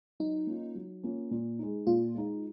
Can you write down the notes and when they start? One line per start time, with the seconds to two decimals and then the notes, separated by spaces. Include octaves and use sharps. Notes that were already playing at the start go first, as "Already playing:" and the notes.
0.20 F#3 D#4
0.47 A#3 C#4 F4
0.75 F#3
1.03 A#3 C#4 F4
1.31 A#2
1.59 G#3 D#4
1.87 A#2 F4
2.15 G#3 D#4